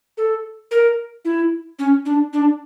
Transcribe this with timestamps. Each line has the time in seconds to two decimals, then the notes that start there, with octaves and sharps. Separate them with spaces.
0.18 A4
0.71 A#4
1.25 E4
1.79 C#4
2.05 D4
2.33 D4